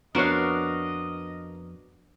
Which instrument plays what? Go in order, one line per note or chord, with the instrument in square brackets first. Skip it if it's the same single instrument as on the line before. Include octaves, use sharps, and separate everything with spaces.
[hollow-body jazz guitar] F2 B3 C#5 [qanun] D4 F#4 [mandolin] A#4 F5 [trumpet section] D#5